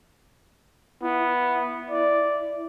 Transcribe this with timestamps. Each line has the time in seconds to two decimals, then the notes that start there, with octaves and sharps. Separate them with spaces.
1.03 B3 E4
1.90 D5